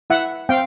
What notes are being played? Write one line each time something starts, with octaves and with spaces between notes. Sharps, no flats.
E4 E5 F#5
C4 F5 G5